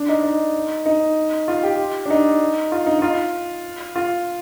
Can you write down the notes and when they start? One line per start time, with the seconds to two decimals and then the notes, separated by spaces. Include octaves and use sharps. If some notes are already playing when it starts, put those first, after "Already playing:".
Already playing: D4
0.09 D#4
0.24 D#4
0.86 D#4
1.48 F4
1.63 G4
2.06 D4
2.10 D#4
2.72 F4
2.86 D#4
2.99 D#4
3.02 F4
3.96 F4